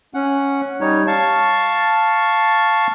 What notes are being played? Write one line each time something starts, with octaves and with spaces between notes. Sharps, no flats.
C#4 F#5
G3 D#4 C#5
F5 A5 C#6